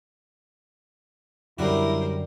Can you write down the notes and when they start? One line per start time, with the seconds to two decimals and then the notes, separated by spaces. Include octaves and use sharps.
1.59 F#2 D3 G3 C#4 E4 F#4 A#4 C5